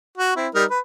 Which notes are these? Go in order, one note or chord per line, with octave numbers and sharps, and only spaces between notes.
F#4
C4 E4
G3 D#4 A#4
B4